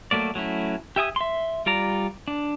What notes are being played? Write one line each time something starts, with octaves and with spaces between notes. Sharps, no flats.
F#3 A3 A#3 D5
F#3 A3 C#4 E4
G4 E5 G#5 D#6
E5 C6
G3 F4 D5 A#5
D4